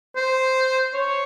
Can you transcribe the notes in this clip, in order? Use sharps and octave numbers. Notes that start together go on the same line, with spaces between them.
C5
C#5